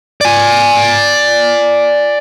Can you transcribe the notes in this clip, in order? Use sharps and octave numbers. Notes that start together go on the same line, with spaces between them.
D5 G#5